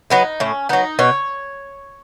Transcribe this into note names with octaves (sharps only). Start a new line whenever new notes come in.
F#3 B3 D#4
A2 C#4
F#3 B3 D#4
B2 C#5